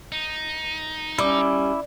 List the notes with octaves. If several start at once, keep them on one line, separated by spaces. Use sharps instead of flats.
D#4
G3 C#4 E4 D6